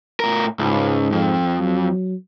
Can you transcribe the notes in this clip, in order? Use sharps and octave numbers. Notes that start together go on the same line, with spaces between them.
A2 A#4
C#2 G#2
F2
F#3